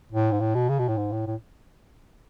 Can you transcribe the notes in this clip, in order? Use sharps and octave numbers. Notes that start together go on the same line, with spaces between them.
A2
G#2
A2
B2
C#3
B2
A2
G#2
A2
A2